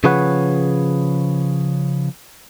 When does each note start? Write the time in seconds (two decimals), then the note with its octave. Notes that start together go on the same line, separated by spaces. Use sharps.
0.04 C#3 F3 G#4 B4 C#5 F#5